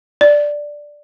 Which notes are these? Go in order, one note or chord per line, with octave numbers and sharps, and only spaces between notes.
D5